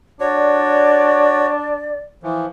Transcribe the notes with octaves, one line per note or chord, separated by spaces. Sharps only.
D4 F#4 C#5 D5
E3 F3